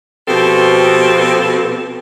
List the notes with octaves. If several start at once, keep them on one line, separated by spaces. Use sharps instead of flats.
B2 F3 C4 G4 A4